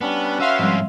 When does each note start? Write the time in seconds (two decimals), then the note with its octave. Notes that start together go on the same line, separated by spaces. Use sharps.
0.01 G3 B3 C#4 D4
0.40 C#4 F#4 B4 E5 F5 C6
0.59 G#2 F3 G3 C4 C#4